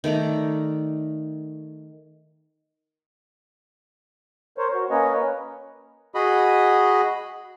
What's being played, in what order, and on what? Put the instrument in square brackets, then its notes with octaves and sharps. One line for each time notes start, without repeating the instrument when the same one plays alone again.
[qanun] D#3 A3 D5 A#5
[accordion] A#4 C5 C#5
F#4
A#3 C#4 A#4 B4 C#5 D#5
B4
[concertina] F#4 G#4 D#5 B5